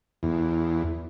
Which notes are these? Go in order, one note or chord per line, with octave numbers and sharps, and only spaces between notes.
E2